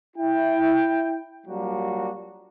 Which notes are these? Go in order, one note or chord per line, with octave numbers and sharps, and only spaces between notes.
E4 G5
A#2 F#3 G3 A#3 D4 F#4